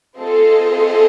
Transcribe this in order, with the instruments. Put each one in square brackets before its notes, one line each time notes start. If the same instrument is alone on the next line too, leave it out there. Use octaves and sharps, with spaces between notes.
[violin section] C4 F4 G#4 C5 D#5 [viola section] A4
[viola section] A4